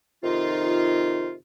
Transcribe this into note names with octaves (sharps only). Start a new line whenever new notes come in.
F2 C3 D#3 D#4 F4